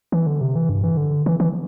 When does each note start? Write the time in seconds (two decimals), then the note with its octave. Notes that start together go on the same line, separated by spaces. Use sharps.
0.12 E3
0.27 D3
0.41 C3
0.55 E3
0.69 G2
0.84 E3
0.97 D3
1.26 E3
1.40 E3